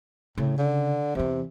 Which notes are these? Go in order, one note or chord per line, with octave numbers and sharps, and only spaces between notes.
A2 C#3
D3
E2 C3 E3